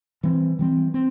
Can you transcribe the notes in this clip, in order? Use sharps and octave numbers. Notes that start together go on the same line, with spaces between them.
E3 G3 C4
E3 G3 C4
C4